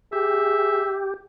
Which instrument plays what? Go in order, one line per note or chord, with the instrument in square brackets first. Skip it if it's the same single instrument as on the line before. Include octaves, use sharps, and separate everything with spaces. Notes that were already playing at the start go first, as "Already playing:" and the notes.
[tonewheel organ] G4 [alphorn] G#4 [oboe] E5